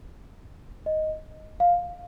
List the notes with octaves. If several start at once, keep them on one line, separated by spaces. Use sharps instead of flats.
D#5
F5